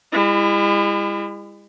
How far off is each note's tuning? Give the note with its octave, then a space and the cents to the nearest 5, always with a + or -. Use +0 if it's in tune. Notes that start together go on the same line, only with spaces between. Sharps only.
G#3 -45 E4 +20